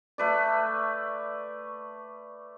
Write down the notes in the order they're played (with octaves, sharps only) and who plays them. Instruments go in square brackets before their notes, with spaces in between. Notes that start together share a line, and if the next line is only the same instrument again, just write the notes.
[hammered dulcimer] A3 B4 D5